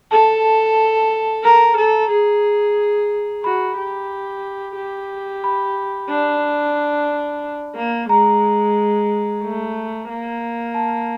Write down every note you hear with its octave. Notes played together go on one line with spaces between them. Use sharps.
A4 A5
A#4 A#5
A4
G#4
F#4 B5
G4
G4
B5
D4
A#3
G#3 A#5
A3
A#3
A5